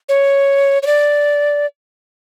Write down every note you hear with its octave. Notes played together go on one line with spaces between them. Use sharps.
C#5
C#5
D5